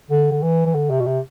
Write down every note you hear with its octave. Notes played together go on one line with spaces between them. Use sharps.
D3
D3
E3
E3
D3
C3
B2
C3